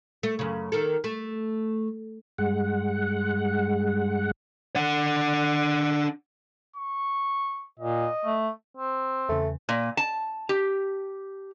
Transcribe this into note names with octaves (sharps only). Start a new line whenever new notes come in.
A3
F#2 C#3
D#3 A#3 A4
A3
G2 G#3 F#5
D4 F#5
C#6
A#2 D#5
A3
C4
E2 C#3 A3
A#2
A5
G4